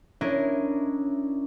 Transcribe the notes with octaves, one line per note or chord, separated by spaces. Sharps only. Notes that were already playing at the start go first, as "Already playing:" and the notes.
C#4 D4 E4 A#4 D#5